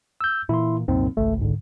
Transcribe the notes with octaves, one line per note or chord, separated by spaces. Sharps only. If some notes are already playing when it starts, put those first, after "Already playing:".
E6 G6
A#2 E3 E4 C6
C2 F#2 A#2 C4 D#4
G#1 C#2 A3
G#2 D3